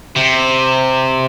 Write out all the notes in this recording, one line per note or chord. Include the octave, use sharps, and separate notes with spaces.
C3